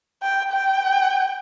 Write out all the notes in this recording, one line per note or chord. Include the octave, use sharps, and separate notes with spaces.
G5
G5